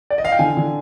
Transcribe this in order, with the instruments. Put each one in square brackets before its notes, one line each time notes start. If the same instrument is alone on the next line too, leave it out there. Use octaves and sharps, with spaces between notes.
[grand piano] D5
D#5
F5
G5
D3 G#5
D3